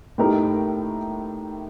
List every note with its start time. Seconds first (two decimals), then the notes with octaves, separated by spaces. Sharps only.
0.18 A2 A3 D#4 G4 A#4